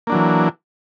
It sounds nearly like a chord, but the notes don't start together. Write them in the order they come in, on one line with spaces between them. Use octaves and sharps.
A#3 D4 F#3 E3